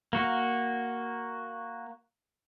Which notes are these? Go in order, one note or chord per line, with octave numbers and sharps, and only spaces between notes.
A#3 F#4